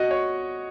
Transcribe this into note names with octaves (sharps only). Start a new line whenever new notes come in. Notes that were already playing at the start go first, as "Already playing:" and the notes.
Already playing: F#4 D#5
C#5